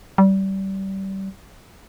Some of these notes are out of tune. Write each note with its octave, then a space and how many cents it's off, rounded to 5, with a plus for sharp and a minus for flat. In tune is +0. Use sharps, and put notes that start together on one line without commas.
G3 -25